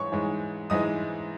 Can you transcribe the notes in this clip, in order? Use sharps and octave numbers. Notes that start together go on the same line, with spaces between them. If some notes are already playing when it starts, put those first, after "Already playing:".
Already playing: G#2 E3 G#3 C#5 C#6
G#2 E3 G#3
G#2 E3 G#3 D#5 D#6